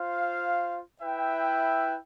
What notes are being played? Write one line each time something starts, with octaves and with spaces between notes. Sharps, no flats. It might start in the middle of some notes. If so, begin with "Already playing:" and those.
Already playing: F4 C5 F5
E4 B4 E5 G5